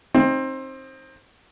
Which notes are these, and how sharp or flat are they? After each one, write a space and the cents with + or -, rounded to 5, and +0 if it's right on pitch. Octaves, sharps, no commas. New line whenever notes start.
C4 +25 D#4 +0